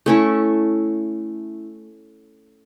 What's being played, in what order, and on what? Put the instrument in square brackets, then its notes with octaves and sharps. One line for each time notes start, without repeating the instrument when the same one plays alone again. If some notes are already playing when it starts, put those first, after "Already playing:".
[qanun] A3 C#4 E4